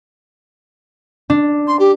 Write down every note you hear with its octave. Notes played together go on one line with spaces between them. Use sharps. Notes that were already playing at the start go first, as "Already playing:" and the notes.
D4
C6
G4